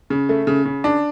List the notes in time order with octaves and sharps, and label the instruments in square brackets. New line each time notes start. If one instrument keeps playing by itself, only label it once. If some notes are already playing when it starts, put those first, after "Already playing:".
[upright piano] C#3
A3
C#3
C#3
D4